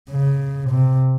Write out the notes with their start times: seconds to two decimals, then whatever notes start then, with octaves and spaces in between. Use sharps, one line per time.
0.10 C#3
0.70 C3